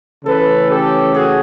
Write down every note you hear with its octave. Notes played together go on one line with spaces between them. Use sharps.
C#3 E3 A3 C#4 A4 B4
G4 A4
F#4 G#4